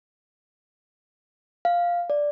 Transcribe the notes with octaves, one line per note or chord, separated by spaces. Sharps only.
F5
D5